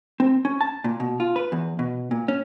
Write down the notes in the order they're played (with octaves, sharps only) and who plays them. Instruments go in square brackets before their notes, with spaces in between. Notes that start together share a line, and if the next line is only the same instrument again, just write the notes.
[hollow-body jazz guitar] C4
C#4
A5
A#2
B2
F4
B4
E2
B2
A#2
C#4